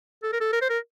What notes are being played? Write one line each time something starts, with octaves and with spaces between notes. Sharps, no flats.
A4
A#4
A4
A#4
C5
A#4